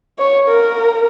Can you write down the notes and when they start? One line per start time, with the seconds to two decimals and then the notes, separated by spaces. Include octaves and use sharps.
0.18 C#5
0.47 A#4